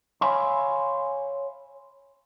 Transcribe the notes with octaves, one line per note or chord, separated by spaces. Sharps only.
C#5 E5 F5 G#5 B5 C6